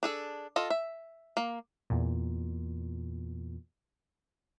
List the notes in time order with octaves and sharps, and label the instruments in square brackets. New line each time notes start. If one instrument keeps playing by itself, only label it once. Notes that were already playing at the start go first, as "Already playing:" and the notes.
[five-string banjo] D4 G#4 A4
F4 A4 D#5
E5
A#3
[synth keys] E2 A#2